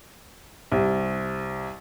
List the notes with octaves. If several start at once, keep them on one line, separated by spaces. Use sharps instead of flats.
C2